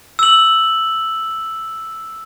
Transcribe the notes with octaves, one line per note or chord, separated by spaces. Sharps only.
E6 F#7